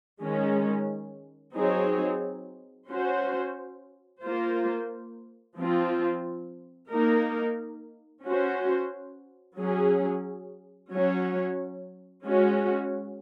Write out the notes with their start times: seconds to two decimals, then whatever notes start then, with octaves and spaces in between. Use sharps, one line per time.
0.22 D#3 G#3 C#4
1.56 F#3 C4 D#4 G#4 C#5
2.90 C#4 F#4 C5
4.24 A#3 F4 C5
5.57 F3 C4 F4
6.91 A#3 D#4 A#4
8.24 C#4 F#4 C5
9.58 F#3 C#4 G#4
10.91 F#3 C#4 F#4 C#5
12.26 G#3 C#4 F#4